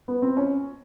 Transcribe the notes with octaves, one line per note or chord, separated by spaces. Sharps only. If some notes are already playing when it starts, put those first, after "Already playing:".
B3
C4
C#4